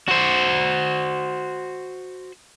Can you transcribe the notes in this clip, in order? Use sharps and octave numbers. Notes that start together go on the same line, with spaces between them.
F#4 C5